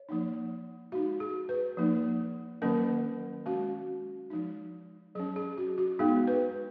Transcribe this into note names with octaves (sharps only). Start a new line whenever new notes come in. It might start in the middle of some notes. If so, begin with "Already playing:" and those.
Already playing: C#5
F3 A#3 D#4
G#3 D#4 F#4
G#4
B4
F3 A#3 D#4
D#3 F#3 A#3 C#4 A#4
G#3 C#4 F#4
F3 G#3 D#4
F#3 C#4 G#4
G#4
F#4
F#4
G#3 B3 D#4 G#4
B4